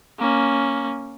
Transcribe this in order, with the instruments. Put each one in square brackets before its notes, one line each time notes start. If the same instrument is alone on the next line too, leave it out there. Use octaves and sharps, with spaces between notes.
[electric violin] A#3 C#4